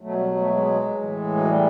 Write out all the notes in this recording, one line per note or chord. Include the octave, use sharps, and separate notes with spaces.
B2 F#3 A3
G3
A3
G#3
A2
E3
F#3
G3